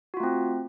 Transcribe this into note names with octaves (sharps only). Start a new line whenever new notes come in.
A3 C4 F4 F#4